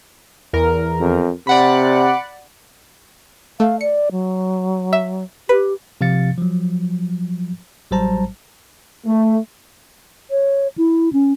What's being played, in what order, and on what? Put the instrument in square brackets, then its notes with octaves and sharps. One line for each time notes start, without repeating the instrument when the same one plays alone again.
[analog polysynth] E2 A#4
[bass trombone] F2
[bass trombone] C3 [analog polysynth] D5 F#5 B5
[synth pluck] A3 [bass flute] F5
[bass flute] D5 [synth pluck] C#7
[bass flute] F#3
[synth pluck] E5
[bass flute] G4 [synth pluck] B4
[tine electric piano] C3 F3 F5 A6 C#7
F3 F#3
A1 F#3 G3 C5 A5 A#5
[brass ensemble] A3
[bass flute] C#5
E4
C#4